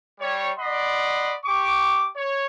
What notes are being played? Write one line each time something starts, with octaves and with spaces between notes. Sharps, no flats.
G3 C#5
D5 D#5 F#5 B5 C6
G4 C#6 D6
C#5